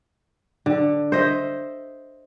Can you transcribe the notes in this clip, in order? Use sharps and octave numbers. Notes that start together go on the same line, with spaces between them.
D3
C5 D#5 E5